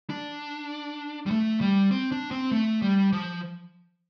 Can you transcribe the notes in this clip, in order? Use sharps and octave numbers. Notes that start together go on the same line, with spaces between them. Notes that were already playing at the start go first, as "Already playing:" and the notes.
D4
G3
A3
G3
C4
D4
C4
A3
G3
F3